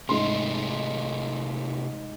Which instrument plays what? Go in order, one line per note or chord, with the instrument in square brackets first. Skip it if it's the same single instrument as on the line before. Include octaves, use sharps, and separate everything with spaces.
[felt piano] G#2 C6 [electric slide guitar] C3 G#3 A3